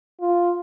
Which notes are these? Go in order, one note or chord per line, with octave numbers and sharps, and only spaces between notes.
F4